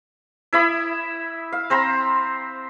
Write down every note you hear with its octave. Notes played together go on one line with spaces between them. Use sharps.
E4 E5 B5 D#6
F5
C4 C5 A#5 B5